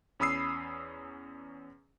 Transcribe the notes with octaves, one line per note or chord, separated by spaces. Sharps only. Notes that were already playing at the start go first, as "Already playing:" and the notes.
E2 C#4 B5 D#6 E6 C7